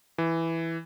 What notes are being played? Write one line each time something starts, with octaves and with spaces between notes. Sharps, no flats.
E3